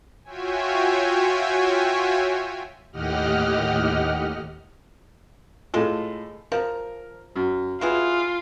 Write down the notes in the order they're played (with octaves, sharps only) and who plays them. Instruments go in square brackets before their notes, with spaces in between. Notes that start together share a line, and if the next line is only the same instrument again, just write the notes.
[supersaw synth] F4 F#4 C#5 E5 G5 G#5
[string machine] D#2 A2 G4 D#5 F#5 F6
[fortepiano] A2 F4 [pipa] G#3 A4
[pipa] F3 [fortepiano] A#4
[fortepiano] F#2
[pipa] F#3 E4 G#4 [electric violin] F4 [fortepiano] B4